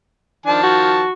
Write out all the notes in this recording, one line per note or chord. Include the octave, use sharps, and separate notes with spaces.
D#3 F3 D4 A5
F#4